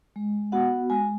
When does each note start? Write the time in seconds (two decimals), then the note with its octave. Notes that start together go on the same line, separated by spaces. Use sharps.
0.16 G#3
0.52 B3 F#4 F#5
0.90 G#3 G#5